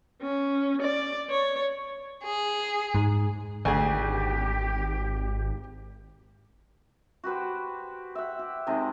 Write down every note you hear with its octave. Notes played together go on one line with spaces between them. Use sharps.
C#4
D5
C#5
G#4
G#2
G#1 D2 G4 G#4
F#4 G4 B4 C5
E5 F#5
G4
C3 D#3 G#3 D#5